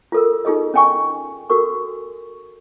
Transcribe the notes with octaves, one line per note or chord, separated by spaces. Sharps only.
F4 A4 A#4
D#4 F4 G#4 A4 D#5
C#4 D#5 G5 G#5 C#6
F#4 A4 A#4 C#6